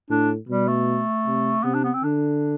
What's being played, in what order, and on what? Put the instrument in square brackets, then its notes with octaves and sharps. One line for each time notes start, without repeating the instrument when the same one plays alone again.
[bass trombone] A2 [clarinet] D4
[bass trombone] B2 [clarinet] G3
[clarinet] A3
[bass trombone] C3
[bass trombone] C3 [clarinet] B3
[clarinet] D4
B3
C4
[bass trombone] D3 [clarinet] D4